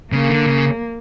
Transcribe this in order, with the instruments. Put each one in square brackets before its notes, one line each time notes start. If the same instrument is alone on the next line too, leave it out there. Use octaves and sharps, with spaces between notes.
[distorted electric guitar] C#3 [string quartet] A#3
[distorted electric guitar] D3
C#3